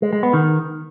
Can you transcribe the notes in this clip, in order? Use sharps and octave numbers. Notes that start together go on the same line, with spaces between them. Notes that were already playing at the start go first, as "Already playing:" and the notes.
G#3
G#3
B3
D#3